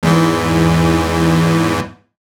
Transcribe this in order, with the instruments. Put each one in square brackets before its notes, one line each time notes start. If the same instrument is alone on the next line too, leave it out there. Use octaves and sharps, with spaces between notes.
[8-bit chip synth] E2 G#2 E3